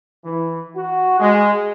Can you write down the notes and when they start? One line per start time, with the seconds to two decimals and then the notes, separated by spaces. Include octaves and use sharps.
0.25 E3
0.75 F#4
1.20 G#3